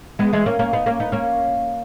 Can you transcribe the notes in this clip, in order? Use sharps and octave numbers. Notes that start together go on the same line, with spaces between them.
G#3 B3
E3 G#3
A#3 C#4
A#3 C#4
B3 D#4
A#3 C#4
B3 D#4
A#3 C#4